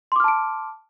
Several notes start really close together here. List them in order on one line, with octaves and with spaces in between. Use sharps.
C6 D6 F6 A5 D7